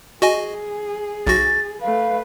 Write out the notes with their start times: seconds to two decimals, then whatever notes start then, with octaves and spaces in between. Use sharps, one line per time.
0.22 F#4 G#4 D#5 G#5
1.27 B1 F#4 A6 A#6
1.82 A3 B4 F5